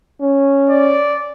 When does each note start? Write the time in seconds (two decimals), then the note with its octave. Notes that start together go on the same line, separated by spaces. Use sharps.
0.21 C#4
0.70 D5